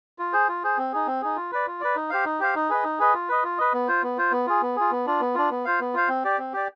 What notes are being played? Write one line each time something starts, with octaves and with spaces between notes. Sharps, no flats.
F4
G#4 C5
F4
G#4 C5
C4
D#4 G#4
C4
D#4 G#4
F4
B4 D5
F4
B4 D5
D#4
G4 C5 F5
D#4
G4 C5 F5
D#4
G#4 B4 D#5
D#4
G#4 B4 D#5
F4
B4 D#5
F4
B4 D#5
B3
F4 C5
B3
F4 C5
B3
F4 G#4
B3
F4 G#4
B3
D4 F4
B3
D4 F4
B3
F4 C5 F5
B3
F4 C5 F5
C4
G4 D5
C4
G4 D5